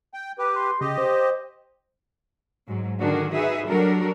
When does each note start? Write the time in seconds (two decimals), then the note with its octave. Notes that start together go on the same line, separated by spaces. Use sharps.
0.14 G5
0.38 G4 B4 D6
0.56 C6
0.81 C#3 G4 D#5
0.98 C5
2.67 G#2 F#3
3.00 D3 D#3 D4 F#4 G#4
3.34 D#4 F#4 G#4 B4 E5
3.68 F#3 G3 D4 F#4 A4 A#4